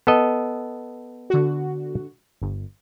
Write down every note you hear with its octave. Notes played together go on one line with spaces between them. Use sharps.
B3 A4 D#5
D3 F#4
G1